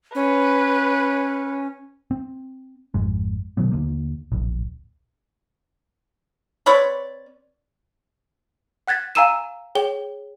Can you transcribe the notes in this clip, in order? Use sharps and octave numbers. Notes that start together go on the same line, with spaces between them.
C#4 B4
C4
G#1 F2 G#3
B2 D#3 F#3 B3
D#2 D3 A#3
D1 A#1
C4 B4 C#5 D5
F#5 F#6 G#6 A6 B6
F5 G#5 A#5 E6 D#7 E7
G#4 C#5 G5 G7